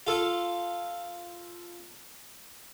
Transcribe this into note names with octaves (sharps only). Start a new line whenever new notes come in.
F4 A4